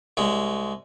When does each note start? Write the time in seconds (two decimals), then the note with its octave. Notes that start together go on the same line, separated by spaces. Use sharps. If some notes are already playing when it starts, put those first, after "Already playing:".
0.17 C2 G#3